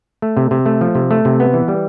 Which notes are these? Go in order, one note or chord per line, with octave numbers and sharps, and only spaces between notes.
A3
C3
C3
A3
F3
C3
A3
C3
B3
E3
G3